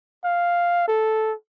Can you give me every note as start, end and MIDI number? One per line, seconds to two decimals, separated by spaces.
0.24 0.85 77
0.88 1.34 69